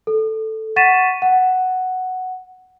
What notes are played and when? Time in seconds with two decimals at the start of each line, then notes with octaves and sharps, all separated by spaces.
0.07 A4
0.76 F#5 C#6 A6 B6 D#7 E7
1.22 F#5